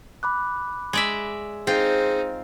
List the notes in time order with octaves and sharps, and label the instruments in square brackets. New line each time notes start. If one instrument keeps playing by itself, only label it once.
[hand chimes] B5 D6 F#6
[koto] G#3 D5 E5
[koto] C4 F4 [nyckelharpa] D#4 C5 [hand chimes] G#4